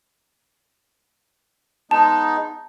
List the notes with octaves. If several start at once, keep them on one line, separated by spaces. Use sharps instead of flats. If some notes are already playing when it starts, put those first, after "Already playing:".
G#3 B3 D#4 A5